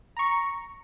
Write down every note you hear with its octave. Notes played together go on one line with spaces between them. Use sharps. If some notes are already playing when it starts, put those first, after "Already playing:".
A#5 C#6